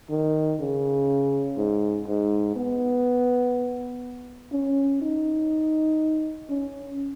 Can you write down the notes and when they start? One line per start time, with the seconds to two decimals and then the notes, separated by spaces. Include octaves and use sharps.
0.10 D#3
0.60 C#3
1.57 G#2
2.08 G#2
2.56 B3
4.53 C#4
5.02 D#4
6.50 C#4